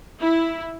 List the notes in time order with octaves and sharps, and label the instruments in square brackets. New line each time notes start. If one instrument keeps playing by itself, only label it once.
[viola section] E4